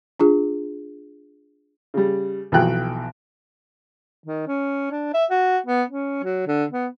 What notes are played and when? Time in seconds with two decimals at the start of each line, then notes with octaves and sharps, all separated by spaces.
0.20 D4 F4 G#4
1.94 C#3 G3
2.52 B1 E3 F3 F#4 G5 F#6
4.25 D#3
4.48 C#4
4.91 D4
5.14 E5
5.30 F#4
5.66 B3
5.89 C#4
6.23 F#3
6.47 D3
6.72 B3